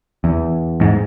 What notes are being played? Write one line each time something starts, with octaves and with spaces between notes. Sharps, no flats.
E2
G#2